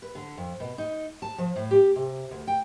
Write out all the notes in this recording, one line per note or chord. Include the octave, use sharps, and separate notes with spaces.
B4
D3
F2
B2
D#4
A5
F3
A2
G4
C3
D2
G5